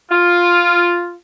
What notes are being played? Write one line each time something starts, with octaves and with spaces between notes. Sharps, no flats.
F4